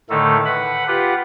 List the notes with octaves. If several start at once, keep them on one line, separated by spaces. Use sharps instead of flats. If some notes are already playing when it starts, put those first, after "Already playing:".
A2 D3 D#3 A3 D#4 A4
B4 F#5 B5
F4 G4 B4 F#5